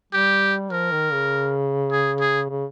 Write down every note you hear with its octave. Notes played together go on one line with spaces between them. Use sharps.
G3 G4
F3 A#4
D#3
C#3
G#4
G#4
C#3